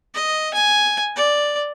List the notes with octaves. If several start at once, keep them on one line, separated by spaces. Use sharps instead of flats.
D#5
G#5
D5